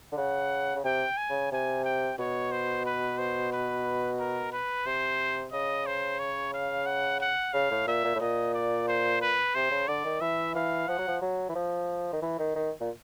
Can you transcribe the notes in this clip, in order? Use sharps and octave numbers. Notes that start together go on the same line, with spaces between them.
D3
C#3 F#5
C#3
C3 G5
G#5
C#3
C3 G#5
G5
B2 C#5
C5
B4
C5
B4
A#4
B4
C3 C5
C#3 D#5
C5
C#5
F5
F#5
F#5
C#3 F5
A2
A#2 E5
A#2
A2
A#2 D#5
D5
C5
B4
C3 C5
C#3
D3 D5
D#3
E3 E5
E3 F5
F3 F#5
F#3
F3
F#3
E3
F3
D#3
E3
D#3
D#3
A#2